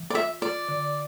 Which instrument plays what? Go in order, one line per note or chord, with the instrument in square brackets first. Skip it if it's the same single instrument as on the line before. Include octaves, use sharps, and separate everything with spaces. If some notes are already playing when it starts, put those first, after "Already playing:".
Already playing: [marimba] E3
[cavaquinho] D5
[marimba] F4 [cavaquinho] E5
[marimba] F4 [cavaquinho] D5
[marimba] D3